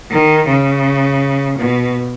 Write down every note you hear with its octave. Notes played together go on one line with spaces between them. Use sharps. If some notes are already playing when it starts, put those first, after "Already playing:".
D#3
C#3
B2